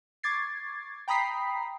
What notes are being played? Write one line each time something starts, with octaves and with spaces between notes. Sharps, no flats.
C#6 D6 G#6 A6 C7
G5 A#5 B5 D#6 B6 C7